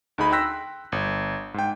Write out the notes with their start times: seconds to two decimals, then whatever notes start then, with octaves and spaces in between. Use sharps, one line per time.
0.18 D2 D#4 G#4 B5
0.32 G5 C6 E6 F#6 A#6 B6
0.92 G1
1.54 G#2 G5